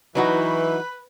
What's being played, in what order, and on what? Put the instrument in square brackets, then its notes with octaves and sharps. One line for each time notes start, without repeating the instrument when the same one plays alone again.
[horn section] E3 [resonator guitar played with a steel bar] F#3 D#4 F#4 [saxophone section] B4